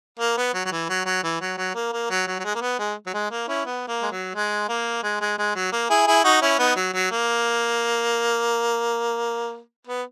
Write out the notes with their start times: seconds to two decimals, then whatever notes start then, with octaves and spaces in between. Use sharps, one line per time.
0.20 A#3
0.37 B3
0.54 F#3
0.65 F#3
0.71 E3
0.89 F#3
1.06 F#3
1.23 E3
1.41 F#3
1.57 F#3
1.75 A#3
1.92 A#3
2.10 F#3
2.27 F#3
2.39 F#3
2.44 G#3
2.55 A#3
2.61 B3
2.79 G#3
3.07 F#3
3.14 G#3
3.31 A#3
3.48 C#4 E4
3.66 B3
3.88 A#3
4.02 G#3
4.11 F#3
4.35 G#3
4.69 A#3
5.03 G#3
5.21 G#3
5.38 G#3
5.55 F#3
5.72 A#3
5.90 E4 G#4
6.07 E4 G#4
6.24 D#4 F#4
6.42 C#4 E4
6.58 B3 D#4
6.76 F#3
6.94 F#3
7.11 A#3
9.87 B3